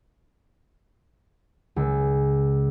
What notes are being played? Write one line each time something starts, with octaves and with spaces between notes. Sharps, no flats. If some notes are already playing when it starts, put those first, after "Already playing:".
C#2